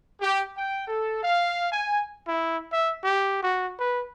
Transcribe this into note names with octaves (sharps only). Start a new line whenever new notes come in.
G4
G5
A4
F5
G#5
E4
E5
G4
F#4
B4